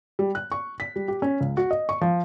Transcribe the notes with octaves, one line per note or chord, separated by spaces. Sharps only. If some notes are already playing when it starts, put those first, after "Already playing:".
G3
F#6
C#6
B6
G3
G4
C#4
C#2
F#4
D#5
C#6
F3